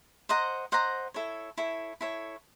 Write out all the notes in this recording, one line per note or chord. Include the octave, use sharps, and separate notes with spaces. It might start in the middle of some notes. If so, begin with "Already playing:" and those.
C5 D#5 F#5 A#5
C5 D#5 F#5 A#5
E4 A4 C#5
E4 A4 C#5
E4 A4 C#5